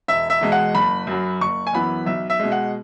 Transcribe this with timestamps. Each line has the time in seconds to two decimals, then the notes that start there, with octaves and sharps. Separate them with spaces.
0.08 E1 E5
0.30 E5
0.41 E2 B2 G#3
0.52 F#5
0.75 F#1 B5
1.07 F#2 F#3
1.41 F#1 C#6
1.67 G#5
1.73 F#2 E3 B3 B5
2.06 B1 E5
2.30 E5
2.40 B2 G#3
2.52 F#5